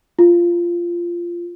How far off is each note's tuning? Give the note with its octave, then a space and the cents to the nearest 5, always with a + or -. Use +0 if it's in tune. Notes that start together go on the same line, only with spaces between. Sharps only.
F4 -15